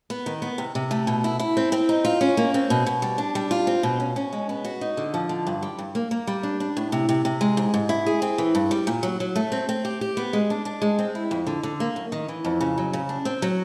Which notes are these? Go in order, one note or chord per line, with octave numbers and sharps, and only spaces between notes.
B3
D#3
B3
C3
C3
A3
B2
E4
E4
C4
C4
D#4
F4
C#4
A#3
C4
B2
B2
G3
D4
G3
F4
C4
B2
C#4
C#4
G#3
B3
F#4
D#4
D3
F3
D3
G2
G3
G2
A#3
A#3
G3
D4
D4
A2
C3
C3
C3
G#3
G#2
G#2
E4
G#4
C4
E3
G2
G3
A#2
F#3
F#3
A3
C4
C4
G4
G4
B3
G#3
D4
D4
G#3
C4
E4
F2
D3
D3
A#3
F#2
D#3
E3
F2
C#3
F#3
C#3
D4
C4
F#3